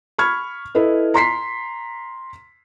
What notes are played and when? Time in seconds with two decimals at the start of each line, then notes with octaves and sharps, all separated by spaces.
0.19 B5 C#6 F6 G#6
0.75 E4 A4 B4 D#5
1.14 A#5 C6 B6 C7